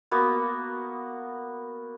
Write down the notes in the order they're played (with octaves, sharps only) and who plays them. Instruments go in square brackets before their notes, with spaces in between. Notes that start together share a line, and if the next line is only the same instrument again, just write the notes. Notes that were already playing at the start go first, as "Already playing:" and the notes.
[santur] A#3 B3 F#4